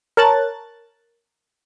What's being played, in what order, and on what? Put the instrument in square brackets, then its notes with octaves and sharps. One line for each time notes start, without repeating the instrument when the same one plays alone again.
[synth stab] A#4 C#5 A5 F#6 A6